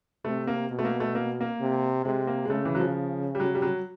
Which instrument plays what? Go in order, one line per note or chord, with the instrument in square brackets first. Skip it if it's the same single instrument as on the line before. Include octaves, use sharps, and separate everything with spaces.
[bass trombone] C3 [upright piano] A3
[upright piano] A#3
[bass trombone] B2
[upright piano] A3
A#3
A3
A#3
A#3
[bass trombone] C3
[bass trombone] C3 [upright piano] G#3
[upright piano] A#3
G#3
[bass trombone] C#3 [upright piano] A3
[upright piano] E3
F#3
F3
G3
F#3
G3
F#3